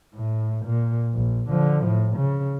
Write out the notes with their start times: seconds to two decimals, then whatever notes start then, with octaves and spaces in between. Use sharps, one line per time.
0.15 A2
0.65 A#2
1.15 A#1
1.49 D3 F3
1.85 A2
2.17 C#3